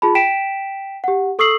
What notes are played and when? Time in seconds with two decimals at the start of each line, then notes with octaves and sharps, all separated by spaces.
0.02 F4 G#4 A5 B5
0.15 G5 B6 D7 E7
1.04 G4 F#5
1.39 A4 C#6 D#6 E6 C7 F#7